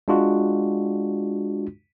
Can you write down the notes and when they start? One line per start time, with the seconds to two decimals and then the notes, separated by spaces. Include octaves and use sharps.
0.08 G#3 D4 F4 F#4